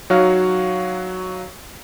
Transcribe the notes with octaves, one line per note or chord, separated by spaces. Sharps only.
F#3 D#4 F#4 C#5 F5 F6